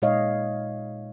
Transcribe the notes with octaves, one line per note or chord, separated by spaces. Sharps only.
A#2 G#3 D#4 C#5 D#5 F5